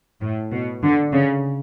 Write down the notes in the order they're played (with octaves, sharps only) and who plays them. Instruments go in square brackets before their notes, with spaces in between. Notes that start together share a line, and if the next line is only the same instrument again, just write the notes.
[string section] A2
B2
D3
C#3